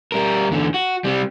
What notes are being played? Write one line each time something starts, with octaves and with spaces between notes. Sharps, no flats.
G3 A#4
E2 D3
F#4
C3 G3